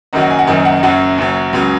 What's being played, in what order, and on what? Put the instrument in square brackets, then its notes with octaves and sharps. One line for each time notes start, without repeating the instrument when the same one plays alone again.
[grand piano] F#1 F#2 D#3 F#3 D#5
F#5
G#5
F#5
F#1 F#2 D#3 F#3 D#5
F#5
F#1 F#2 F#3 F#5
F#1 F#2 F#3
C#2 C#3 F#3